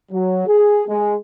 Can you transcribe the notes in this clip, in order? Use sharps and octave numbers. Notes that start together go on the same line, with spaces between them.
F#3
G#4
G#3